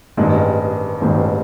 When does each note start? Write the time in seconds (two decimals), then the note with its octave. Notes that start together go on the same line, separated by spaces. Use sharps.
0.17 A1 G2 D#3 G#3 C4
1.00 A1 G2 D#3 G#3 C4